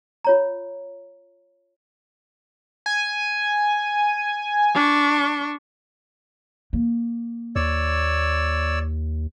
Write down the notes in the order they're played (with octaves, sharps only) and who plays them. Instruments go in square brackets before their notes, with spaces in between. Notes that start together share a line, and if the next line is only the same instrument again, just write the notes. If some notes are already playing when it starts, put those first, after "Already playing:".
[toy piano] F4 C#5 A#5
[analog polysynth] G#5
[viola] D4 C#6
[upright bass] A#3
[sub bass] D#2 [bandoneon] C#5 D5 E6